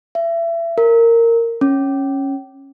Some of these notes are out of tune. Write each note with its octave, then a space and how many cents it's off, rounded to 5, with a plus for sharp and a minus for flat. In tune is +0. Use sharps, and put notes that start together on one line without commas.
E5 +30
A#4 -15
C#4 -10